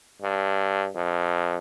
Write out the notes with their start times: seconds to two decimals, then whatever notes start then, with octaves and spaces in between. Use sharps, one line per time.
0.22 G2
0.95 F2